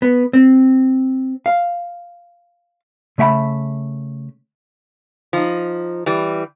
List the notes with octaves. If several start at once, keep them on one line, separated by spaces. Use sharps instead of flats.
B3
C4
F5
C#3 A3 E5 F#5 B5
F3 D#4
E3 G3